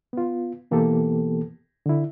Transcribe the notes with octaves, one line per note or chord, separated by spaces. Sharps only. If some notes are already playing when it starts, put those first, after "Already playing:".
B3 F4
B2 E3 A#3 B3 G4 A4
D3 E4